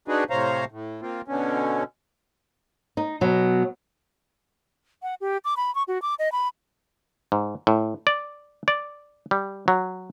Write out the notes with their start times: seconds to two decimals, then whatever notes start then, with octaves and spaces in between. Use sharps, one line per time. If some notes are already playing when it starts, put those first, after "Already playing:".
0.08 D4 D#4 F#4 G#4 B4
0.30 A2 C3 C5 C#5 F5 A#5
0.72 A2
1.02 A#3 C4 F4
1.28 B2 D3 C#4
2.97 D#4
3.21 B2 F#3
5.03 F#5
5.21 G4
5.45 D6
5.57 B5
5.75 C#6
5.88 F#4
6.02 D6
6.19 D#5
6.32 B5
7.32 G#2
7.67 A2
8.07 D5
8.68 D5
9.31 G3
9.68 F#3